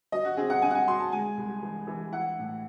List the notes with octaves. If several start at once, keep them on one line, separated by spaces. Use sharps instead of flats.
F#3 D#5
F#4
C4 G#4
F#5
C4 G#5
F#5
G#5
F#3 C6
A5
G#3 G#5
C2
E3
E3
E4 F#5
A2